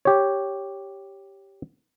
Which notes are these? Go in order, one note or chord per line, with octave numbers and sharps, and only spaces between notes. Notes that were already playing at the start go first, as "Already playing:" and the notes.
G4 C#5